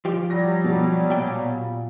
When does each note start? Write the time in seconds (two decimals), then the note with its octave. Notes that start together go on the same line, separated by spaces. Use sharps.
0.05 F3 G4
0.30 F#3 G3 A#6
0.64 B2
1.10 A#2 G5